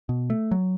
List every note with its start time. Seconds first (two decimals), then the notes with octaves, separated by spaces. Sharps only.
0.09 B2
0.30 A3
0.51 F#3